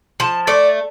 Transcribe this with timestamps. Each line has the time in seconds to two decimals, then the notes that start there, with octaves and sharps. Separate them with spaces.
0.20 F3 A5
0.47 A3 D5